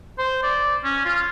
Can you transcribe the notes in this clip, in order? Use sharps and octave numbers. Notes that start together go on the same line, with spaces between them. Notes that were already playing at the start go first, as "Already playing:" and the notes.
C5
D5
C#4
F4